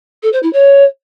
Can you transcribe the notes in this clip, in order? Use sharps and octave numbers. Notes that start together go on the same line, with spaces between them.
A4
C5
E4
C#5